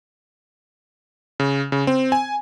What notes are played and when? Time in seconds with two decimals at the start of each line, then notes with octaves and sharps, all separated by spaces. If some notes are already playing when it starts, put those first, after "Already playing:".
1.40 C#3
1.72 C#3
1.87 C4
2.12 G#5